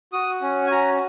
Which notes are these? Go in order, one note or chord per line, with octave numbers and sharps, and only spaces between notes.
F#4 D#6
C#4
G#5
F#4 A#5